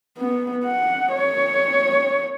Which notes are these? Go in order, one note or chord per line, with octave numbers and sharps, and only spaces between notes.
B3
F#5
C#5